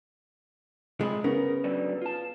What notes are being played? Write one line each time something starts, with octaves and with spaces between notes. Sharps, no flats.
C3 F3 G#3 B5
C#3 B3 A#4
D3 F#3 G3
F4 A5